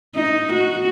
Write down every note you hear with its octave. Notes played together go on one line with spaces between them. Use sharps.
D#4
F#4